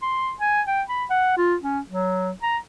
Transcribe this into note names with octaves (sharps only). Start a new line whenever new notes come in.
C6
G#5
G5
B5
F#5
F4
C#4
F#3
A#5